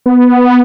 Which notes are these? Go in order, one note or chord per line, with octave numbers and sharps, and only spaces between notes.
B3